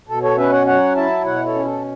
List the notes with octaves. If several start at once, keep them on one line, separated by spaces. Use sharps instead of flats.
B2 A4
A4 C#5
C#4 B4 E5
C#5 F#5
F#3 C#5 F#5
E4 E5 A5
B2 C#5 F#5
A4 C#5
C#4
A4